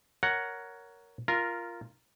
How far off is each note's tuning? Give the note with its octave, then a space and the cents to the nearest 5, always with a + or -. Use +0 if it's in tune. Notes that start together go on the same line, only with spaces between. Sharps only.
A#4 +0 C#5 +15 F#5 +0
F4 -10 A#4 +0